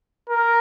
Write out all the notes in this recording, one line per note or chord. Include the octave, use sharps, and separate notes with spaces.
A#4